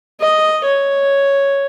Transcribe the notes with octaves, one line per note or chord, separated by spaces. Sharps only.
D#5
C#5